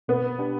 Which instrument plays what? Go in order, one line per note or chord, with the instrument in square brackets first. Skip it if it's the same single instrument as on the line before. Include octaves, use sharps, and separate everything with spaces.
[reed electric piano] B2 [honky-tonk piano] B3
[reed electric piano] B3 D4 G4